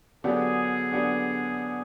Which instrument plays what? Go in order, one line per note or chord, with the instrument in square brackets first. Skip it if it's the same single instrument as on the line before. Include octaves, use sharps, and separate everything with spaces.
[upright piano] D3 F#3 B3 D4 G4 [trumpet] G#4
[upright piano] D3 F#3 B3 D4 G4